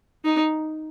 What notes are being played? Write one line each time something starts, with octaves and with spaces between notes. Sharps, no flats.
D#4